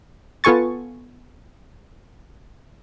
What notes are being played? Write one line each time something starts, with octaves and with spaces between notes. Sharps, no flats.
B3 F4 A4 G#5 C#6 A6